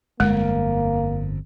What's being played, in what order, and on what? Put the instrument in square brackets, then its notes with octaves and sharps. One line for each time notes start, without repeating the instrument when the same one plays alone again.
[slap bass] G1 F2 [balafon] G#3 [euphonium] A#3